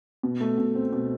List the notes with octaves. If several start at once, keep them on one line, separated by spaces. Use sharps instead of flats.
B2
A3
B2
C4
B2